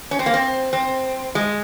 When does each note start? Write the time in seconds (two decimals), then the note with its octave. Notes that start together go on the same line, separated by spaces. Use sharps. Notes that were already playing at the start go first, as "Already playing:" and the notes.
0.11 C#4
0.19 C4
0.26 A#3
0.34 C4
0.73 C4
1.35 G#3